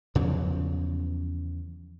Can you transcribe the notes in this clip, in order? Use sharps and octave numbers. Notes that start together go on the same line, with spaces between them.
E2 C#3 F3 F#3